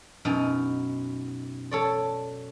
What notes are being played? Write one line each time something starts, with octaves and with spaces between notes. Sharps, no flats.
F#2 B2 D#4
A4 C#5 D5